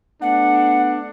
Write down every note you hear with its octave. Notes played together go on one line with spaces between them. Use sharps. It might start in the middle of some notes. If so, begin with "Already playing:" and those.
A3 B3 D4 F#5